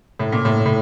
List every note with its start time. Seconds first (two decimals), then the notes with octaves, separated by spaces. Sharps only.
0.19 A2
0.32 A#2
0.45 A2
0.65 A2